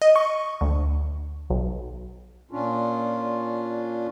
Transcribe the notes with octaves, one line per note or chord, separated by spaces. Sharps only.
D#5
C#6
D2
B1
A#2 C#4 D4 F4